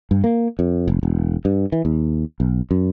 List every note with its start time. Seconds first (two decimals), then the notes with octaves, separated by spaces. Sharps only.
0.11 G2
0.24 A#3
0.59 F2
0.88 F1
1.03 E1
1.45 G2
1.72 E3
1.85 D#2
2.40 B1
2.71 F#2